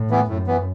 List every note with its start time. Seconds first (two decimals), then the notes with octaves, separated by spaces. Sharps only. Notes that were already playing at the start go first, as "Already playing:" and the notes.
Already playing: A2
0.10 E3 B3
0.28 F#2 A2
0.47 E3 B3